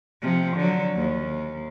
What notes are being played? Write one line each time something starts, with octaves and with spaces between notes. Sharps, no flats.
C3 F3
D3 F#3
D#2